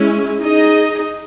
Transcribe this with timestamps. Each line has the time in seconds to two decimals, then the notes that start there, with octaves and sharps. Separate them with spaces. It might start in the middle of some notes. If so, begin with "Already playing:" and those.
Already playing: G#3 C#4 E4
0.40 D#4 G#4 D#5